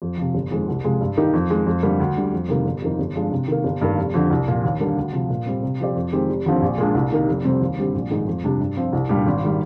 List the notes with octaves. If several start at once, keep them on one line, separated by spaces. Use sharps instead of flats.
F2
C3 F3
G1
F2 D#3 G#3
C2
C3 F3 G#3
G2
D#3 A#3 D#4 G4
F2
D#3 G#3
F2
D3 G3 A#3
D2
D3 G3
F2
C3 D#3 G3 A#3
G1
F2 D#3 A#3 D#4
G1
G2 F3 G#3 D4
C3
D#3 A#3
G1
G2 D#3 A#3
F1
F2 D3
C2
A#2 F3
D#2
D3 G3 A#3 D4
D2
C3 F3
A#2
G3 C4
C3
F3 C4 G4 D5
F2
D#3 G#3 C4 G4
F1
D#2 D3 F3 C4
A#1
A#2 G#3 D4
C2
C3 D#3 A#3 D#4
F1
F2 C3 G3 C4
D#2
D3 G3 C4 G4
A#1
G#2 D#3 G#3 D#4
F2
C3 G3 D4 G4
G2
F3 C4 F4
C2
A#2 G3 D4 G4
G#1
D#3 G3